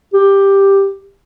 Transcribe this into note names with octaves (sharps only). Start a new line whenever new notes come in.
G4